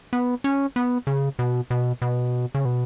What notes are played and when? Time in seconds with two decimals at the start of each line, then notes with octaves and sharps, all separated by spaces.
0.13 B3
0.44 C#4
0.76 B3
1.07 C#3
1.39 B2
1.71 B2
2.02 B2
2.55 C#3
2.65 B2